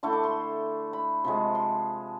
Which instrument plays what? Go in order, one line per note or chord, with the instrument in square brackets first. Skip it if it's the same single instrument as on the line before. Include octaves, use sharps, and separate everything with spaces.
[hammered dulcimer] D3 A3 E4 C6
D6
C6
B5
C3 F3 G#3
C6